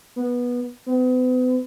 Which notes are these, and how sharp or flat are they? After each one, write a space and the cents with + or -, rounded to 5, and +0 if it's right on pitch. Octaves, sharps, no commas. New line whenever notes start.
B3 -15
B3 +40